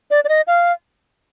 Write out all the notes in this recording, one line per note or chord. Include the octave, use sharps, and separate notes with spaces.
D5
D5
D#5
F5